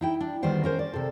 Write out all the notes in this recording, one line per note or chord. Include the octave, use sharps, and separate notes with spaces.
D#4 E4 G5
D4
D2 D#3 G3 B3 C5 G5
C#4 A#4 C5
D5
C3 A4